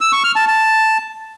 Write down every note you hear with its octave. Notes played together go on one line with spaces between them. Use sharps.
E6
C#6
F6
A5
A5